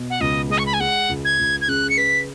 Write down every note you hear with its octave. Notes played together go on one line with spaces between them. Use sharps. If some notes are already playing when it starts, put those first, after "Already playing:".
Already playing: B2
F#5
C#2 D#5
G#3 D#5
C#6
B5
G#5
G#3 F#5
C#2
G#6
C#2
G#6
C#3 F#6
C#7
B4 B6